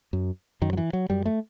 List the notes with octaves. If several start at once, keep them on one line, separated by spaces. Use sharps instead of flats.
F#2
F#2 D#3
F#3
E3
F#3
F#2 G3
A3